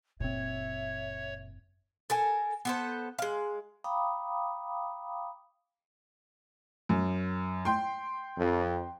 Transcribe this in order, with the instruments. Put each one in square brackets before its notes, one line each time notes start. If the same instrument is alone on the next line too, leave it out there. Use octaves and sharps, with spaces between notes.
[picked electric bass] F#1 C4 [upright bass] A#2 [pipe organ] C#5 [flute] E5
[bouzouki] A4 A#4 G#5
B3 A4 C5
G#3 F5
[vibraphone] F5 G5 A#5 B5 D6 D#6
[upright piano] F#2
G5 C6
[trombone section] F2